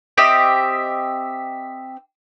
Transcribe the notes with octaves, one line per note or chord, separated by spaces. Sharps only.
C4 G4 D#5 E5